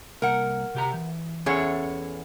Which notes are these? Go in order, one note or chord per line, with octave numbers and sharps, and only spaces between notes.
C2 A#3 A#4 F#5
C3 G4 A#5
E3
E2 C#4 G#4 A4 C#5 F#5